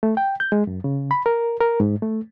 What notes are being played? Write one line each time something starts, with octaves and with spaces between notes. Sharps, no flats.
A3
G5
G6
G#3
F#2
C#3
B5
A#4
A#4
G#2
A3